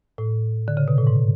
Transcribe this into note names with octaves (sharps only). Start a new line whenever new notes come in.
A2
D3
C#3
B2
A2
G#2